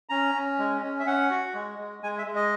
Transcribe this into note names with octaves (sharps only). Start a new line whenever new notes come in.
C#4 A#5
C#4
G#3
C#4
E5
C#4 F#5
F#4
G#3
G#3
G#3 G#5
E5
G#3
D#5